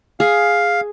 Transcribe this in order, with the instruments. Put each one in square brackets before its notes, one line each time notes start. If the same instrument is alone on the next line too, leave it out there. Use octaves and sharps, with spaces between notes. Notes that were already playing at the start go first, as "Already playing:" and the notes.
[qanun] G#4 [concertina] F5